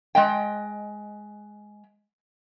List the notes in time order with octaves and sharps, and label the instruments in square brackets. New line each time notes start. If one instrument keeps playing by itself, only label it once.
[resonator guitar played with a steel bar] G#3 D#5 G5